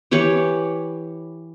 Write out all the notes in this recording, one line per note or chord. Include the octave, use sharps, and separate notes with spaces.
E3 G4 B4 C#5